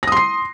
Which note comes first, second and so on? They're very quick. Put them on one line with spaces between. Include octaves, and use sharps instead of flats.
A#6 D#6 C6 C7